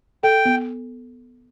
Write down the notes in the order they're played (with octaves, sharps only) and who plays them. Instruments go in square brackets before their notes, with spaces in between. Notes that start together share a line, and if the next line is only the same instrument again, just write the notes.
[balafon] A4 [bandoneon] G5
[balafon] B3